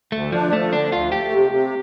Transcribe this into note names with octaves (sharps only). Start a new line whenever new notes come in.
D2 A3
F3 D4
F3 A3
D3 D4
D2 F4
A3 G4
C3
C3